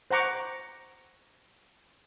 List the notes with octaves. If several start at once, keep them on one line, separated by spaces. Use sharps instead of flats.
C5 F#5 A#5 C#6 D6